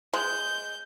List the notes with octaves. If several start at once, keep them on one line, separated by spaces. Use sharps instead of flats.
G#3 G6